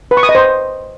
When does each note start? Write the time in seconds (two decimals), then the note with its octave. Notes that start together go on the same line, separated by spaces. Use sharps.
0.11 B4
0.17 C#6
0.23 D#6
0.29 D#5
0.35 C5